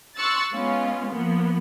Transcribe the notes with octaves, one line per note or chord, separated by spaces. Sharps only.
C6 C#6 E6 F#6 A6
G#3 B3 C#4 F4
F3 A#3 B3